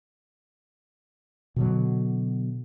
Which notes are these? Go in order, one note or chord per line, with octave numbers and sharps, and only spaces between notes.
B2 D3 F#3